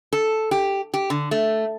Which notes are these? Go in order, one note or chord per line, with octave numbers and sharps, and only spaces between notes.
A4
G4
G4
D3
A3